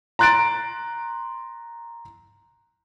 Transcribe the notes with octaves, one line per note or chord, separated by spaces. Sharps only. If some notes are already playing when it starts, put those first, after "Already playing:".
A#5 C6 F#6 A6 D7